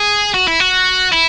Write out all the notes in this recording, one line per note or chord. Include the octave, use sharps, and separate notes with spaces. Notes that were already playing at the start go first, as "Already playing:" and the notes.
Already playing: G#4
F#4
E4
F#4
E4